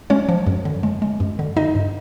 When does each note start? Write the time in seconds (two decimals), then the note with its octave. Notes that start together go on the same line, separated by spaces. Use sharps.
0.10 G#3 C#4 C#5
0.29 F3
0.47 F#2
0.65 D3
0.83 G#3
1.02 G#3
1.20 F#2
1.39 D3
1.57 D3 D#4 D#5
1.75 G2